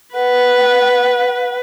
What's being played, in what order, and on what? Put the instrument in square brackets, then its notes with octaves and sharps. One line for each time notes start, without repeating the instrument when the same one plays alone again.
[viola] B4 [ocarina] F#5